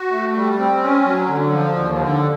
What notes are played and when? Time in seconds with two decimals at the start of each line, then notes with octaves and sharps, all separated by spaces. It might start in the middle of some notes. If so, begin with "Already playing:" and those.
Already playing: F#4
0.12 A3
0.36 G3
0.58 C4
0.82 C#4
1.06 F#3
1.28 D3
1.52 F3
1.75 D#2
1.99 D3